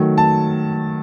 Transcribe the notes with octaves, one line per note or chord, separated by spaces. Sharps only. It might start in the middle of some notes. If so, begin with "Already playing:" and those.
Already playing: D#3 F#3 A3
A5